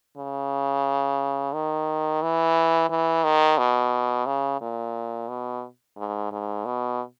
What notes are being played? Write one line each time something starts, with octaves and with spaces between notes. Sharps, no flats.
C#3
D#3
E3
E3
D#3
B2
C#3
A#2
B2
G#2
G#2
B2